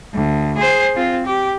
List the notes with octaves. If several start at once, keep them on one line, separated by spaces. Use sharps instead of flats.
D2
G#4 C5
C4 F4
G4